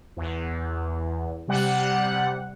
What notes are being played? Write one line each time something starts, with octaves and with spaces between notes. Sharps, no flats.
E2
C3 G3 F#5